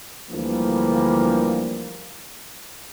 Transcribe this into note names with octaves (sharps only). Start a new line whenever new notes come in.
D2 D3 E3 F3 G3 A#3